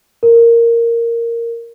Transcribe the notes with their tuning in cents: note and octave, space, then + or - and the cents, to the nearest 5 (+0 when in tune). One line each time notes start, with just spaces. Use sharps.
A#4 -5